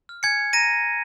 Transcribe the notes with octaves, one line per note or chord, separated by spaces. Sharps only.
F6
G#5 G#6 C#7
G#5
A#5 A#6 D#7